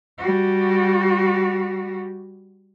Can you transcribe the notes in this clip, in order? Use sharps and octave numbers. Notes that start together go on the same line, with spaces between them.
G3 F#4